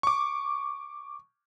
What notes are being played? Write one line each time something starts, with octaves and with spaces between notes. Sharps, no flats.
C#6 D6